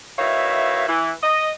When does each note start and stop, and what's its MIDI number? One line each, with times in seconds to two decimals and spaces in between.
0.18 0.84 47
0.18 0.84 51
0.18 0.84 64
0.18 0.84 73
0.18 0.84 76
0.18 0.84 77
0.88 1.12 52
1.23 1.51 75